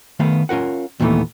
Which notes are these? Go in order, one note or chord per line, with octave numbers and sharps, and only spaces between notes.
D#3 A3 B3 F5
C#4 F4 A#4 F#5
D#2 A#2 D#3 E3 A3 B3